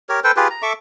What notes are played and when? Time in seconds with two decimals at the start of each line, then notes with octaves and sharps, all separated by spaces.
0.09 G4 A#4 C#5
0.24 A4 B4 C5 G5
0.37 F4 G4 G#4 B4
0.50 A#5
0.62 A4 E5 C#6 D6